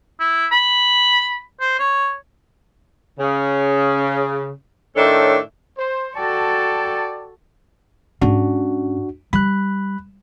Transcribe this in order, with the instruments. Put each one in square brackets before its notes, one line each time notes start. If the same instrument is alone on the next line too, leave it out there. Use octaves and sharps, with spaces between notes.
[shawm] E4
B5
C5
C#5
[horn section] C#3
A2 D#3 D4 A4 C#5 E5
[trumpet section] C5
[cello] F#4 A4 [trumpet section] D5 G5 A5
[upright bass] G#2 C#4 [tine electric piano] D4 F#4
[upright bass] G3 [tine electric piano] B5 F#6